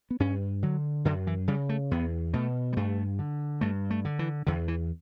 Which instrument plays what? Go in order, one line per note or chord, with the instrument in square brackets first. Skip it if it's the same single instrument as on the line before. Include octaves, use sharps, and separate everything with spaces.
[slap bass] B3
G2 C#4
D3 F#3
F#2 D3
E3
C#3 G3
A3
E2 B3
B2 A3
G3
G2 A3
D3
G2 A3
A3
D3
E3
E2 D3
E3